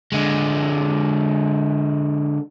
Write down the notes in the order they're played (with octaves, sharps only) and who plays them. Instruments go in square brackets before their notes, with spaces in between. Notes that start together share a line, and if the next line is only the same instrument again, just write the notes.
[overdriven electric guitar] D3 G#3